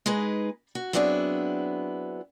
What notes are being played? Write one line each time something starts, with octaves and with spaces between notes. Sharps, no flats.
G#3 D#4 G#4 B4
F#4
F#3 B3 C4 D4 E4 G#4